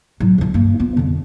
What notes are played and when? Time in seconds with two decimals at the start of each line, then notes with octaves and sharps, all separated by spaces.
0.20 A2 F#3
0.38 D3 F3
0.54 G2 A#3
0.80 B3 F4
0.97 F2 D3